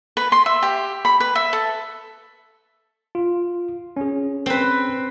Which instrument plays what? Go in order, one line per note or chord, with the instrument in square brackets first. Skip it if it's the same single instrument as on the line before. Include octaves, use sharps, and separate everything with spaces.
[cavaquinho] B4
C6
E5
G4
B5
B4
E5
A4
[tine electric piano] F4
C#4 G#4
[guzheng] C4 B4